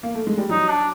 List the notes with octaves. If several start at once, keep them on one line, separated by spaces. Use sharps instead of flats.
A#3
A3
G#3
G3
F#3 D#4
D4